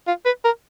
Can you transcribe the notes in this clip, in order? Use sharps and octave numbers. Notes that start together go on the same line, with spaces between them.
F4
B4
A#4